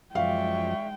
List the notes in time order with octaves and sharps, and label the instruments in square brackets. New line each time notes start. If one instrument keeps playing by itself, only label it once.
[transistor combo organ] F#2 F3 [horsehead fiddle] G#3 G5 [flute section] D5 E5 C#6 [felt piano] F5